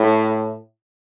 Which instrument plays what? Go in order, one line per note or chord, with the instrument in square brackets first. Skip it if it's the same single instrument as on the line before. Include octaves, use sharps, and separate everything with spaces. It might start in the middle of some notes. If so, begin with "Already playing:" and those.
Already playing: [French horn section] A2